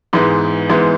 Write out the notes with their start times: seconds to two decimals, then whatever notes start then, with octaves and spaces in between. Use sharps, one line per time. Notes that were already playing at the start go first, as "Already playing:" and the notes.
0.13 G#2 E3 G#3 B3
0.69 G#2 E3 G#3 B3